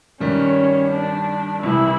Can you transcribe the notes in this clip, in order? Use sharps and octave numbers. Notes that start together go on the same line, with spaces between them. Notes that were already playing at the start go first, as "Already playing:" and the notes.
G2 D#3 G3 C#4
D4
C2 C3 E3 E4